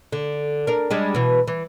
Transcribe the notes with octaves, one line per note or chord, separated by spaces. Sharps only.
D3
D4 A#4
G3 G#3 D4
B2 E3
E3